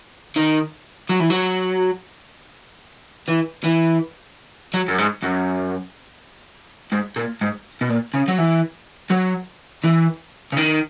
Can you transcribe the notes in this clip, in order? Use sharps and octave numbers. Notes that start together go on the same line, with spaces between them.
D#3
F#3
E3
F#3
E3
E3
F#3
F#2
G#2
F#2
G#2
A#2
G#2
B2
A#2
C#3
F#3
E3
F#3
E3
C#3
D#3